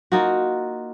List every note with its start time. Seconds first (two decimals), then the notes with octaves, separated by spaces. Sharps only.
0.12 A#3 D#4 F4 F#4